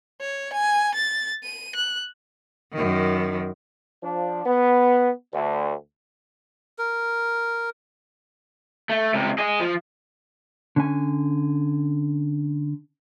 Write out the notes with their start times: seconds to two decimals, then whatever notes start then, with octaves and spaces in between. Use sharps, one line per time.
0.21 C#5
0.53 G#5
0.94 A6
1.43 D#7
1.75 F#6
2.73 F#2 D#3
4.03 F3 D4
4.46 B3
5.32 D2
6.78 A#4
8.90 A3
9.14 C#2 C3
9.38 G#4 D#5
9.60 F3
10.76 D3 C#4 G#5